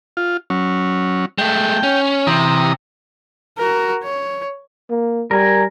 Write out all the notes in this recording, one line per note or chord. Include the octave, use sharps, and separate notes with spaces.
F4
F#3 C#4
G#3 A3 G5
C#4
C3 E3 A#5 D#6
F#4 A#4
C#5
A#3
G3 A#4 G#5